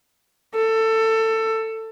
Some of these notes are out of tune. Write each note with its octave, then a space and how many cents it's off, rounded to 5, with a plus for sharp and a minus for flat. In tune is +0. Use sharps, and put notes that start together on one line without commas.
A4 +20